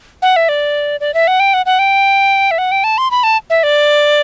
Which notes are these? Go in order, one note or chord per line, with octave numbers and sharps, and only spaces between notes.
F#5
E5
D5
D5
E5
F#5
G5
F#5
F#5
G5
E5
F#5
G5
A5
C6
B5
A5
E5
D5